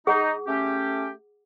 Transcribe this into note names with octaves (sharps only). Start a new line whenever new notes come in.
D#4 G#4 F#5 D6
A3 C#4 G4